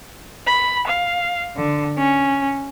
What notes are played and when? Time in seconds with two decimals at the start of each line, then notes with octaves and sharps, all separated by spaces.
0.46 B5
0.87 F5
1.56 D3
1.97 C#4